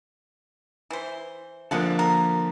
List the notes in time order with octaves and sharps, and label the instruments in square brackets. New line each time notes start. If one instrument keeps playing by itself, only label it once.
[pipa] E3 C5
[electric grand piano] D3 F3 A#3 [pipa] G#3 F#5 A5
[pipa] A#4